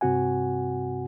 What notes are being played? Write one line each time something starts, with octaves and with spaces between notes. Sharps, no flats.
G2 C3 C4 F#4 F#5 G#5